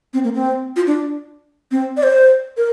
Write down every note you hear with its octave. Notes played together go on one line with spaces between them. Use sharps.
C4
A#3
C4
F4
D4
C4
D5
C5
A#4